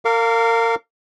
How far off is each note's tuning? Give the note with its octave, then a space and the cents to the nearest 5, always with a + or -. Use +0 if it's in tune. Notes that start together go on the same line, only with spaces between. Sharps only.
A#4 -30 F5 +0 D6 -35